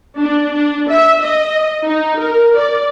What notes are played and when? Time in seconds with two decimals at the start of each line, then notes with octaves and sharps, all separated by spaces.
0.18 D4
0.54 D4
0.89 E5
1.21 D#5
1.85 D#4
2.19 A#4
2.55 D5